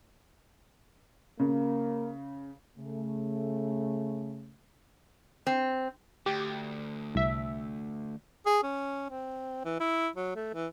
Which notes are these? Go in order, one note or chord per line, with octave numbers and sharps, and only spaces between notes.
C#3 A#3
C#3 A3
C4
D2 G4
C2 E5
G#4
C#4
C4
E3
E4
F#3
A3
E3